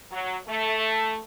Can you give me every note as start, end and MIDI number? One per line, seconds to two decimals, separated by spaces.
0.12 0.36 54
0.47 1.19 57